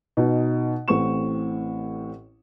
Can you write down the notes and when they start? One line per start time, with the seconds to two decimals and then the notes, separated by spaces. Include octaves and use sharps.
0.17 B2 D#4
0.88 A1 A2 C4 C#6 E7